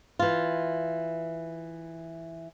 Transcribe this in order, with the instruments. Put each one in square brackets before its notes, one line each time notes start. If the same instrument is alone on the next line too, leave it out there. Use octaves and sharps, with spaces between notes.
[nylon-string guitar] E3 F4